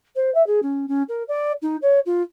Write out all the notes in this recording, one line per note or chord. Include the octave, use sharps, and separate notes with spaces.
C5
E5
G#4
C#4
C#4
A#4
D5
D#4
C#5
F4